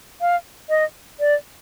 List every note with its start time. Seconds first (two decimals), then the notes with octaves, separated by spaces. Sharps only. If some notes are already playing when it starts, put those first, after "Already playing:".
0.21 F5
0.69 D#5
1.20 D5